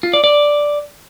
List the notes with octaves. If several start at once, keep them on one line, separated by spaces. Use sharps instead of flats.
F4
D5
D5